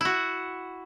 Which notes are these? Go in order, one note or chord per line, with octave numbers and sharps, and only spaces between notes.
E4 F#4